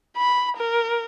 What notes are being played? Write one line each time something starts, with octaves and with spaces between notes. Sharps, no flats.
B5
A#4